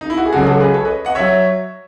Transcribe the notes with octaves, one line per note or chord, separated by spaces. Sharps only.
D#4
E4
F#4
G#4
C#2 C#3 F#3 F#4 A4
F#4 A4
G#4 B4
A4 C#5
B4 D#5
D#5 F#5
F#3 C#5 E5